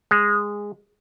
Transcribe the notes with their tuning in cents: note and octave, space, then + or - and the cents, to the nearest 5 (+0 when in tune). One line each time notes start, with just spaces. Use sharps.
G#3 -10